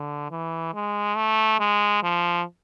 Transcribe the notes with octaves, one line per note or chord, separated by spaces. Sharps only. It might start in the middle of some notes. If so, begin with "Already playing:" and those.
Already playing: D3
E3
G#3
A3
G#3
F3